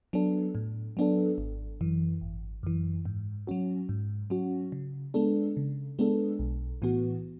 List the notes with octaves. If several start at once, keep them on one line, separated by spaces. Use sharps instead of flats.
F#3 B3 D4 A4
A2
F#3 B3 D4 A4
G#1
F#2 E3
G#1
F#2 E3
G#2
F#3 C#4 F#4
G#2
F#3 C#4 F#4
C#3
G#3 B3 D4 A4
C#3
G#3 B3 D4 A4
B1
A2 E3 B3 F#4